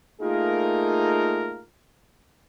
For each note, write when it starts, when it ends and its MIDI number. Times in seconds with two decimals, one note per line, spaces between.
0.22 1.63 57
0.22 1.63 58
0.22 1.63 63
0.22 1.63 65
0.22 1.63 68
0.22 1.63 70